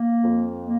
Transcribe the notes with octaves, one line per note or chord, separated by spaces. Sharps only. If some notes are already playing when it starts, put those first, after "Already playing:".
Already playing: A#3
F2
A#3